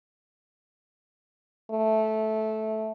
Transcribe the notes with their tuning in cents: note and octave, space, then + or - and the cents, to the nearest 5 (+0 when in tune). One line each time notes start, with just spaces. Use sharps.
A3 -10